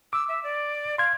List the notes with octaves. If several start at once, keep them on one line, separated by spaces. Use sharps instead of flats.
D6 E6
E5
D5
F5 C6 G#6